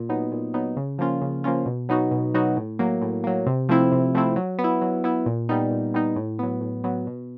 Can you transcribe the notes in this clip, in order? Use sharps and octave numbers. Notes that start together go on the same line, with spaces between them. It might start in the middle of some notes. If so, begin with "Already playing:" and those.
Already playing: A#2
F#3 B3 D#4
A#2
F#3 B3 D#4
C#3
F3 A#3 C#4 F4
C#3
F3 A#3 C#4 F4
B2
F#3 B3 D#4 F#4
B2
F#3 B3 D#4 F#4
A2
F#3 A#3
A2
F#3 A#3
C3
F3 A3 C4 E4
C3
F3 A3 C4 E4
F#3
B3
E4
F#3
B3 E4
A#2
G3 B3 D#4
A#2
G3 B3 D#4
A2
F#3 B3
A2
F#3 B3
B2